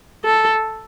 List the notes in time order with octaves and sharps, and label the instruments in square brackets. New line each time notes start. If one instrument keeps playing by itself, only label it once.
[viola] A4